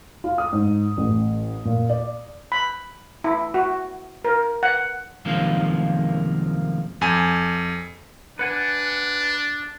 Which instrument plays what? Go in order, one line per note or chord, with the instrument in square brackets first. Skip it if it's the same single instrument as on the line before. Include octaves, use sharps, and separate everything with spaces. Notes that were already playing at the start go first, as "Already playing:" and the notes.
[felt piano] F4
D#6
G#2
A1
A#2
D5
[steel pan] B5
E4
F#4
A#4
F#5
[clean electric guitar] F#2 C3 D#3 F3 G#3 A#3
[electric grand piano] F2 G#5
[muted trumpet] D4 [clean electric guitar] B4 F#5 G#5